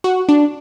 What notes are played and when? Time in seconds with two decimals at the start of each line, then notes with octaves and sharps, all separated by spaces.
0.04 F#4
0.29 D4